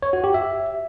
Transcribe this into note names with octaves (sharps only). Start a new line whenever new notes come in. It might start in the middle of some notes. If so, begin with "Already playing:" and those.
C#5
F#4
G4
E5